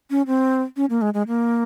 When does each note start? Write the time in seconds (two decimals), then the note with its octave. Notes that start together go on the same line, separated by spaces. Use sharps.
0.10 C#4
0.27 C4
0.76 C#4
0.90 A#3
1.01 G#3
1.14 G#3
1.28 A#3